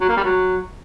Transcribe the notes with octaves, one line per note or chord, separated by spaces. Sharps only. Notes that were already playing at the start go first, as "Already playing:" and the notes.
F#3
A#3
G3
F#3